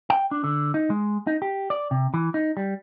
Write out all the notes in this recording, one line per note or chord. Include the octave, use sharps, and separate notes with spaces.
G5
D4
D3
D#4
G#3
D#4
G4
D5
C3
E3
D#4
G3